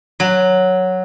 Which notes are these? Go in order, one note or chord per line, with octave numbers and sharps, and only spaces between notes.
F#3